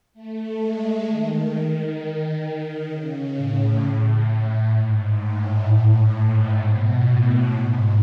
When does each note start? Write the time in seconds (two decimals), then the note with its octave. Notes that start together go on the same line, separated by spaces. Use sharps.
0.14 A3
0.60 G#3
1.05 D#3
2.89 C#3
3.36 A2
4.73 G#2
5.18 A2
5.65 A2
6.11 G#2
6.56 B2
7.03 A2
7.48 G#2